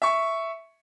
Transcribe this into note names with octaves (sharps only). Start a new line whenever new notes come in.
E5 C#6